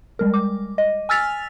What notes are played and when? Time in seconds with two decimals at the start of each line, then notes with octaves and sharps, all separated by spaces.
0.19 G3 G#3 A#4
0.34 D6
0.78 D#5
1.09 G#5 E6 F6 A6 B6 F7